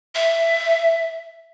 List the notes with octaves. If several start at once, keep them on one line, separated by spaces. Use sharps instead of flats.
E5